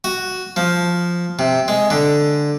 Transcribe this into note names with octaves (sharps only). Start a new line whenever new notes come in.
F#4
F3
C3
G#3
D3